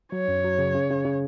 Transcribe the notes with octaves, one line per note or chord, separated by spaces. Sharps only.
F#3 C#5
F#2
F#3
C#3
C#3
C#3
C#3